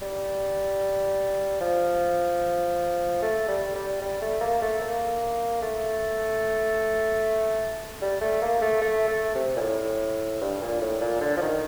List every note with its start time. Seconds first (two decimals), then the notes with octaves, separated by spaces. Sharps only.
0.02 G3
1.61 F3
3.22 A3
3.48 G3
3.75 G3
4.02 G3
4.22 A3
4.41 A#3
4.62 A3
4.81 A#3
5.62 A3
8.02 G3
8.21 A3
8.42 A#3
8.62 A3
8.82 A3
9.08 A3
9.35 C3
9.56 A#2
9.61 A2
10.41 G2
10.62 A#2
10.81 A2
11.01 A#2
11.21 D3
11.37 F3
11.42 D#3